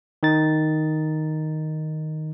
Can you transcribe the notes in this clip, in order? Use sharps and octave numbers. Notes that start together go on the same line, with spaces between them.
D#3 D#4 A6